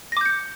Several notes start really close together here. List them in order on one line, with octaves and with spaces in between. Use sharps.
A#6 D6 G6 C#7